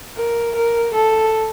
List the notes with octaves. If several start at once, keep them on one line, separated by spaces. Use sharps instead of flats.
A#4
A#4
A4